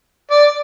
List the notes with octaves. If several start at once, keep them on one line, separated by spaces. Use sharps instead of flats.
D5